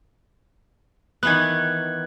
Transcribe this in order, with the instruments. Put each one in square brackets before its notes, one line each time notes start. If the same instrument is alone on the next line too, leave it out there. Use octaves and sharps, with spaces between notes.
[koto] D#3 E3 B3 [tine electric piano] F#6 G#6